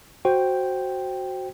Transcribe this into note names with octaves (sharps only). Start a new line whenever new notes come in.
F#4 C5 G5